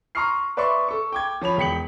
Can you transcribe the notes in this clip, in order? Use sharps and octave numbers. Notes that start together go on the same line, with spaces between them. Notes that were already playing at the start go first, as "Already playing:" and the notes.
A#5 C6 C#6 D#6 F6 C7
B4 D5 E5 C6 C#6
A4 C#6
G5 D6 G#6
F3 C#5 B5 F7
E1 G5 B6 C#7 F#7